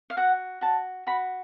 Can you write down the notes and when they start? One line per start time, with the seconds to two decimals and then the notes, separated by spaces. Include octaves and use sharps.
0.10 F5
0.17 F#4 F#5
0.61 F#4 A5
1.07 F#4 B5